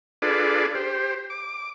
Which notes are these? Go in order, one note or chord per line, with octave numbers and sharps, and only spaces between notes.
D4 F4 G#4 A4 B4 D5
G4 C5
D6